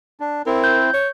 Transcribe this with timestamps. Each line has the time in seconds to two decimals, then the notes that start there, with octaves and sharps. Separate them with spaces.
0.20 D4
0.46 C4 E4 A#4
0.64 G6
0.94 C#5